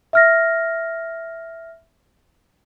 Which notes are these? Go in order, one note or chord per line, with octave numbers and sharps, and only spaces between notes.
E5 F6 A#6